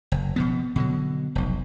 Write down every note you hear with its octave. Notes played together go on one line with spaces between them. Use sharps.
F#1
B2 F3 B3
B2 D3 F#3
F1 B1